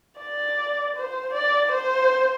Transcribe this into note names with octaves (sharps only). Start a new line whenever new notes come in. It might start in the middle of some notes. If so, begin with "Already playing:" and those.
D5
C5
D5
C5